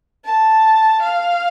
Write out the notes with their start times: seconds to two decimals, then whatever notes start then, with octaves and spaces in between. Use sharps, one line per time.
0.25 A5
1.02 F5